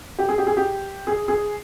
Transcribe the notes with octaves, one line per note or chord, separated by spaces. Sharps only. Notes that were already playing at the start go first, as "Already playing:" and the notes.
G4
G#4
G4
G#4
G4
G#4
G#4